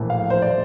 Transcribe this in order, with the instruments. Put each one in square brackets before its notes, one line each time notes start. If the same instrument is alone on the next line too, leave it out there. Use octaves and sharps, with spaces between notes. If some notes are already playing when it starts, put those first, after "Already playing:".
Already playing: [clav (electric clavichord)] A#1 A2 E3 A3
[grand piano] F5
C5
D5